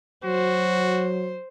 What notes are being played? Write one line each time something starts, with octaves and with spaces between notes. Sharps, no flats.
F#3 F#4 C5